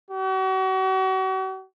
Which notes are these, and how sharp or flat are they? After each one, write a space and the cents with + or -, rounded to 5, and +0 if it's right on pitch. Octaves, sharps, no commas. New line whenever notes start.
F#4 +40